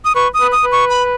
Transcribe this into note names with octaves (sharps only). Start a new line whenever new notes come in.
D#6
B4 C#6
D#6
B4
D#6
B4
C#6
B5